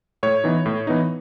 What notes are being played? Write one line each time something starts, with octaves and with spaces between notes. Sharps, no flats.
A2 C#5
E3 B3 D#4
A2
E3 B3 D#4